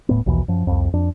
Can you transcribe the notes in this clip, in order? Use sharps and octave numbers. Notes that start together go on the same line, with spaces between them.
D#1 A2 B3
A#1 D#2 B2 E3
F#2 F3
C2 F2
F2 D4